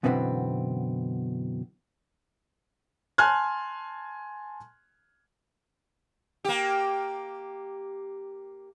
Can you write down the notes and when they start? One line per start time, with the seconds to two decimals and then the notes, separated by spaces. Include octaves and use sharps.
0.03 F#2 B2 D3 E3 B3 C4
3.18 G#5 A5 C6 F6 F#6 G#6
6.44 A#3 G4